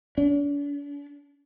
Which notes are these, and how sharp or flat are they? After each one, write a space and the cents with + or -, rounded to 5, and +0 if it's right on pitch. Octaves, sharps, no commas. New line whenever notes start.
D4 -45